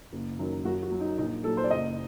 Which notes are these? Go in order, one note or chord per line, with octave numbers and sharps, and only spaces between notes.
F#1
F#2 D#3 F#3
F#2 F#4
F#4
F#3
D#4
A#1 D#4
A#2 F#3 A4
C5
D5
F#1 D#5